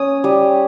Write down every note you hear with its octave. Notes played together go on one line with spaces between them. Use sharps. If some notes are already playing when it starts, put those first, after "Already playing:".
Already playing: C#4 D#6
G3